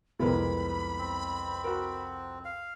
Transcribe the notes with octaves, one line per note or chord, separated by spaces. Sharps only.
C2 F2 G#3 B3 A#4 B5
C4
F#4 A#4
F5